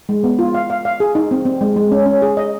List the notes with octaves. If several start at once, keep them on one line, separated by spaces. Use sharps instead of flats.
G#3
B3
F4
F5
F5
F5
G#4
D#4
C4
C4
G#3
G#3
C#4
C#4
G#4
D#5